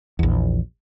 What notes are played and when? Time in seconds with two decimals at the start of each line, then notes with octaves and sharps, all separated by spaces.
0.19 A#1 E2